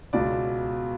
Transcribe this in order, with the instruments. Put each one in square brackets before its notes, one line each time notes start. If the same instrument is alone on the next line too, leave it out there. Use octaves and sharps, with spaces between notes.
[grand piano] C#2 B2 D5